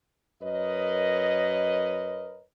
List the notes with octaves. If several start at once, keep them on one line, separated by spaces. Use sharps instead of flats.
F#2 A#4 B4 C#5 D#5